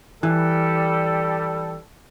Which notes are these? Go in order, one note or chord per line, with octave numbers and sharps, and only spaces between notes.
E3 G3 A4